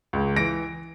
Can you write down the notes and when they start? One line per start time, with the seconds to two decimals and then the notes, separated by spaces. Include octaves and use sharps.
0.13 C#2
0.36 E3 A#6 D7